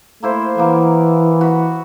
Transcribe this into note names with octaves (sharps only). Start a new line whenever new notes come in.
A3 A#3 E4 C5
E3 A#3 B3
F#4 B5